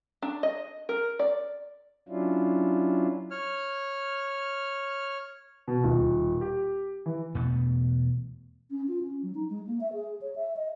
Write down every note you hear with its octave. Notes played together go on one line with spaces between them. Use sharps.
D4
D#5
A#4
D5
F#3 C#4 D4 E4 F4
C#5 F6
B2
D#1
G4
E3
E2 B2 A3 B3
C#4
F4
C#4
F#3
D#4
G#3
A#3
E5
G#4
C#5
E5
D#5